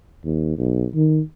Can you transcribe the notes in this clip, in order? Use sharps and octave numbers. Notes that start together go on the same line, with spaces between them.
D#2
B1
D#3